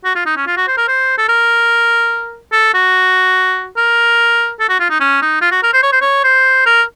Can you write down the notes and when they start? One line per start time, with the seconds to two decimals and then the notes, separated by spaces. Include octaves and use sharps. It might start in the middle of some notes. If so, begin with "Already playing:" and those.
0.05 F#4
0.15 F4
0.26 D#4
0.37 C#4
0.47 F4
0.57 F#4
0.68 C5
0.77 A#4
0.88 C5
1.18 A4
1.29 A#4
2.52 A4
2.74 F#4
3.77 A#4
4.60 A4
4.69 F#4
4.80 F4
4.90 D#4
5.00 C#4
5.22 D#4
5.42 F4
5.52 F#4
5.63 A#4
5.73 C5
5.83 C#5
5.92 C5
6.01 C#5
6.24 C5
6.66 A#4